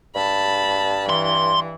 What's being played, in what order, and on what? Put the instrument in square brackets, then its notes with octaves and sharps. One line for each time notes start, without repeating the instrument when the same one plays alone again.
[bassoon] G2 [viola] A5 B5
[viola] E3 [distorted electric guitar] C6